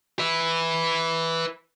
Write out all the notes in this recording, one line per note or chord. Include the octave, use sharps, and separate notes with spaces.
B4 E5